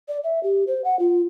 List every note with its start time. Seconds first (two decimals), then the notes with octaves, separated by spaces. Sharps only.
0.08 D5
0.24 E5
0.43 G4
0.67 C5
0.84 F#5
0.99 F4